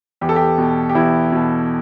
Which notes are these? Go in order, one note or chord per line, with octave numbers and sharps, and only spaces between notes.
E2 G4
A4
G4
B2
G4
E2 E4
B2